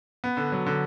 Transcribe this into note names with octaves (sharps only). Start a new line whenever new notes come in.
B3
D3
F#3
D3